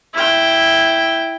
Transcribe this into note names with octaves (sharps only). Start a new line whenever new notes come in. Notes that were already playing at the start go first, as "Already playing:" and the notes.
E4 G5